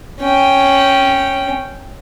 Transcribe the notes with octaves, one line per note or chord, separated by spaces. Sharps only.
C#4 G5